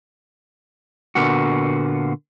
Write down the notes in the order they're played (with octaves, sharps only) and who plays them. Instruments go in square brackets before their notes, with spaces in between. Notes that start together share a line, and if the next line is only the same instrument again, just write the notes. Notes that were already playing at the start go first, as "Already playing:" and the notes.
[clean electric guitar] A#2 D3 A#3 B3 F#4